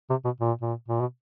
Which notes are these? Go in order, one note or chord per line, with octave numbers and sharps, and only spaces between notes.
C3
B2
A#2
A#2
A#2
B2